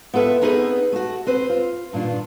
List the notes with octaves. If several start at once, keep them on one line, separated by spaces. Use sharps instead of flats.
B3 F4 A4 B4 E5
B3 C4 D#4 G#4 A4 B4
A3 F#4
C4 B4 C5
F4
G2 A#2 D#3 D4 F4